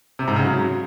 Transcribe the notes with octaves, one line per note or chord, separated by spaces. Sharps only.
C3
G#2
C#3
F#3